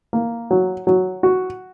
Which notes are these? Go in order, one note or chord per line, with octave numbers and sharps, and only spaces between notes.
A#3
F#3
F#3
F#4